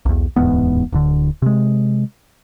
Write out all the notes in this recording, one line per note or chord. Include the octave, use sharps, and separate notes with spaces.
B1 E2
D1 E2 G#2 B3
D1 D3
C3 G#3